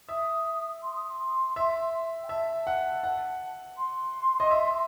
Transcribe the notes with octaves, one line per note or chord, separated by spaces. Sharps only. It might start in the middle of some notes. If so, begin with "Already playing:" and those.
E5 D#6
C6
D#6
C6
E5
G5
E5 A5
F#5
F#5
C6
D#5
E5